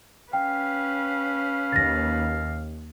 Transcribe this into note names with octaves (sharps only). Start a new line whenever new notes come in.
C#4 B4 F5 G5
D#2 A6 A#6